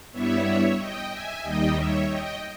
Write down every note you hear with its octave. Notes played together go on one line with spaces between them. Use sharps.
G2 G3 B3 E4 C#5 E5
D#5 G5
E5 G#5
D#2 D#3 G3 D#5 G5
C#5 E5
D#5 G5